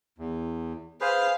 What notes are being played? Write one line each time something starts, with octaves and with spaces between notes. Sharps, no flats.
E2
G#4 B4 C5 F5